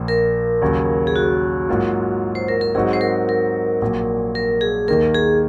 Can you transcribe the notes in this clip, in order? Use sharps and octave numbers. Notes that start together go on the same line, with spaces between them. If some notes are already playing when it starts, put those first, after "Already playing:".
Already playing: A#1 A#2 F3 A#3
A#4
D#2 C#3 F#3
G#4
F#4
G#2 F#3 A#3 F4
C5
A#4
A#4
G#2 F#3 C4 D#4 F#4 G#4
C5
A#4
A#4
A#1 A#2 F#3
A#4
G#4
D#2 D#3 A#3 A#4
G#4